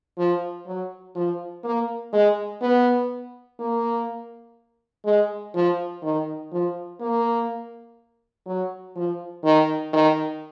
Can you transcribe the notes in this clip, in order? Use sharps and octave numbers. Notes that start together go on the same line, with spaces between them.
F3
F#3
F3
A#3
G#3
B3
A#3
G#3
F3
D#3
F3
A#3
F#3
F3
D#3
D#3